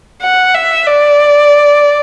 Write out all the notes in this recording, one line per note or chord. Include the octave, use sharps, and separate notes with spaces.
F#5
E5
D5